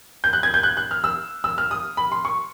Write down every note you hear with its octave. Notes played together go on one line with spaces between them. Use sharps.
G6
F#6
G#6
G6
F#6
F#6
F6
E6
E6
F6
D#6
B5
C6
C#6